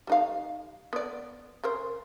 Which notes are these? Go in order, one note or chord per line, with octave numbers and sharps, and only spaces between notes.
G3 D#4 F5
B3 D5
C#3 A#4 C5